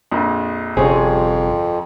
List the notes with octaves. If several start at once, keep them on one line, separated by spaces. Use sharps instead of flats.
A#1 F2
G1 F2 C3 C4 C#4 G#4